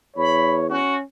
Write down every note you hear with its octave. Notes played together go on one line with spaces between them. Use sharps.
E2 C#5 B5
C#4 F#4